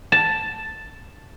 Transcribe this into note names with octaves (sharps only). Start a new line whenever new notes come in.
A5